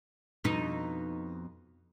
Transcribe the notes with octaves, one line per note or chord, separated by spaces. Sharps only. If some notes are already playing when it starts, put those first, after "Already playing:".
F2 B2 D#4